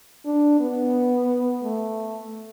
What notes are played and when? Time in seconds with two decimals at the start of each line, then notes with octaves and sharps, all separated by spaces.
0.25 D4
0.60 B3
1.63 A3